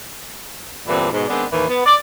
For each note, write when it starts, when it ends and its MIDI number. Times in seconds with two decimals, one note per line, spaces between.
0.87 1.09 40
0.87 1.09 43
0.87 1.09 46
0.87 1.09 50
0.87 1.09 52
0.87 1.09 60
1.11 1.24 44
1.11 1.24 47
1.28 1.44 51
1.28 1.44 56
1.28 1.44 59
1.28 1.44 60
1.28 1.44 62
1.51 1.66 39
1.51 1.66 45
1.51 1.66 52
1.67 1.82 59
1.85 1.95 74